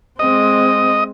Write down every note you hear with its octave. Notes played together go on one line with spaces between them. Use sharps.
G#3 C4 D#5